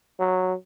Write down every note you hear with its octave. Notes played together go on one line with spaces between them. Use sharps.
F#3